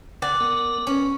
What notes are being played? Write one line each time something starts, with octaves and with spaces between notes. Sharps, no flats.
C#3 D5 F#5
B3 A#4
C#4 B4